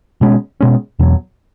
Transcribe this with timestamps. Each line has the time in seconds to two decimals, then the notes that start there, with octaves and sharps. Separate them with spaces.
0.21 B2 G#3 C#4
0.61 B2 G#3 C#4
0.99 E2 B2 F#3